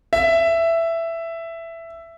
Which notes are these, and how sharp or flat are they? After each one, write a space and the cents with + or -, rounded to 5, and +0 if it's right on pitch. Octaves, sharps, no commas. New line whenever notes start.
E5 +10